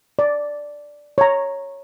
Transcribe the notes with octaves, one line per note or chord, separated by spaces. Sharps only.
D5
C#5 A#5